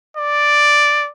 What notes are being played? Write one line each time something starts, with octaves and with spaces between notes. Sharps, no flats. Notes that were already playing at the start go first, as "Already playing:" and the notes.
D5